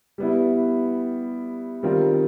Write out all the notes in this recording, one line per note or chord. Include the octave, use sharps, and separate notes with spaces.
G3 B3 E4
D#3 G3 C4 F4 A#4